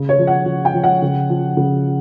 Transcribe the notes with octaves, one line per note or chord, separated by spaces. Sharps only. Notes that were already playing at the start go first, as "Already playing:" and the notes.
Already playing: C#3
C#5
F3
F#5
C#3
G5
F3
F#5
C#3
F3
C#3